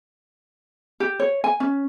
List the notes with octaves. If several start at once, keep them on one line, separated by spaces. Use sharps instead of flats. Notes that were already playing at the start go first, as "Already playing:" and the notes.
G4
C#5
G#5
C#4